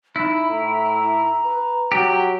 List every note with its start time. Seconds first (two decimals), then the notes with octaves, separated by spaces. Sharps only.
0.16 D#4 E4 B5
0.50 A2 A#5
1.45 B4
1.92 F#3 G4